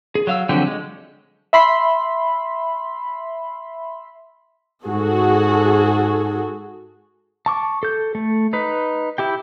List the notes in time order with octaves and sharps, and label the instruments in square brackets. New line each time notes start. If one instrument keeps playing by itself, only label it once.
[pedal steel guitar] G#4
F#3 F5 E6
D3 F3 F#3 C4 G4
G#3
[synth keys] E5 B5 C6
[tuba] G#2 [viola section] F#4 G#4 A4
[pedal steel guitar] A5 C#6 D6
A4 G6
A3
D#4 B4
E4 G4 G5